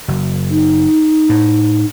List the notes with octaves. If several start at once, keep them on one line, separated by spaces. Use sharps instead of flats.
F#1
D#4
A2